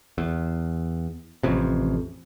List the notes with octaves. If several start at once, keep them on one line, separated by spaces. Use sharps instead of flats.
E2
A1 F2 C3